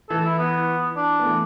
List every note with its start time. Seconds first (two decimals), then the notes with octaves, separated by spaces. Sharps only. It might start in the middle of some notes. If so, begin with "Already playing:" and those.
0.10 E3 A4
0.25 E4
0.39 B3
0.97 D4
1.20 B3
1.26 E3 A3